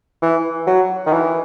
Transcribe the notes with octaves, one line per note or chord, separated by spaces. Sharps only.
E3
F#3
D#3
E3